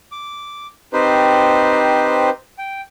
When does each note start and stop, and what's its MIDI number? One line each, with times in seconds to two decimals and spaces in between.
0.12 0.67 86
0.93 2.30 60
0.93 2.30 63
0.93 2.30 67
0.93 2.30 71
0.93 2.30 72
2.58 2.81 79